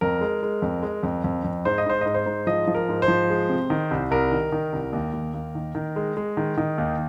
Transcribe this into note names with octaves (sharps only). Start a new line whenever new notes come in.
F2 A#4
G#3
G#3
F2
G#3
F2
F2
F2
G#2 C5
D#5
G#2 C5
G#2 D#5
C5
G#2
F3 D#5
F3
A#4
G#2
C5
F3
G#3
C3
D#3
C2
C2 A#4
D#3
D#3
C2
D#2
D#2
D#2
D#3
D#3
G#3
G#3
D#3
D#3
D#2